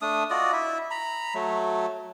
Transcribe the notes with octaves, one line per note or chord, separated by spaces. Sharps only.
A3 D4 D#6
F4 F#4 D5 D#5
E4 E5
A#5 B5
F#3 A3